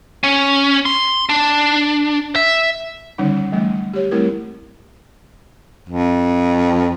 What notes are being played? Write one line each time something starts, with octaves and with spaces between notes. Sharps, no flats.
C#4
C6
D4
E5
D3 D#3 G3 C#4 D#4
E3 F#3 G3 A3
G4 C#5
G3 A3 C4 E4 A#4
F2